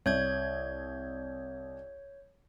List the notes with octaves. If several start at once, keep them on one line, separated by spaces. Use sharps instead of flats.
C2 C#5 G6 G#6